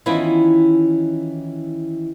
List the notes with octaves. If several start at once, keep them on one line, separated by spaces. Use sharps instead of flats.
D#3 E3 B3 C#4 E4 F4